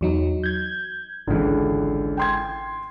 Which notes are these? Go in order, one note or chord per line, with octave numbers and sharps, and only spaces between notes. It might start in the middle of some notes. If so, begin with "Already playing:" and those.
E2 F#3 D#4
G6 G#6
G#1 C#2 D3 E3
G5 C6 G#6